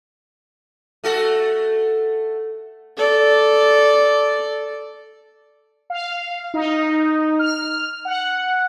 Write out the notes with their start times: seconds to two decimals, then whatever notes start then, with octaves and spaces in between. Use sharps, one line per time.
1.04 A3 F#4 A4
2.97 A4 D5
5.90 F5
6.54 D#4
7.39 F6
8.05 F#5